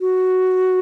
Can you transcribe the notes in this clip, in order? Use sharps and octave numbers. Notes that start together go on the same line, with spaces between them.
F#4